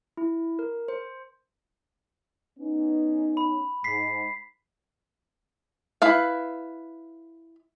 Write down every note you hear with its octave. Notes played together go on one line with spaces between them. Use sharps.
E4
A#4
C5
B3 C#4 D#4
B5
G#2 B6 C7
E4 B4 F5